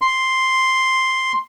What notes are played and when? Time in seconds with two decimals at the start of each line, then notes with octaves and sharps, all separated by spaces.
0.02 C6